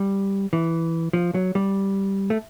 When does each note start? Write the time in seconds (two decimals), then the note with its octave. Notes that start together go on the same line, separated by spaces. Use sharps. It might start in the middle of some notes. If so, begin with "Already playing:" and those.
Already playing: G3
0.53 E3
1.13 F3
1.34 F#3
1.55 G3
2.30 A3